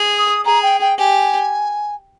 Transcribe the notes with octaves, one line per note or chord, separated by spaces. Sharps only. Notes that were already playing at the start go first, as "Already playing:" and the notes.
Already playing: G#4
D#6
G#4 A#5
G5
G5
G4 G#5